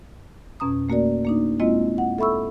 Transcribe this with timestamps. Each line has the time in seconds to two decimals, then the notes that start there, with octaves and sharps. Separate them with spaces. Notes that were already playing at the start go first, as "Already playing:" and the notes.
0.60 F2 B2 C#4 A#5 D#6
0.89 A3 A#3 F#4 A#4 D5
1.25 A#3 D4 D#4
1.60 G#3 A#3 C4 E4 F4 D#5
1.98 F#5
2.18 A4 E5 B5 C#6 E6